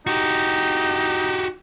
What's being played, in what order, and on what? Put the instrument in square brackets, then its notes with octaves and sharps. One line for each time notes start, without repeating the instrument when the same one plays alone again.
[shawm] D#4 [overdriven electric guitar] F#4 G4